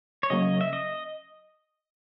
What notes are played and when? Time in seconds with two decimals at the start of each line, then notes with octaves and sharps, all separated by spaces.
0.23 C#5
0.30 C#3 F#3 A#3 D#5
0.61 E5
0.73 D#5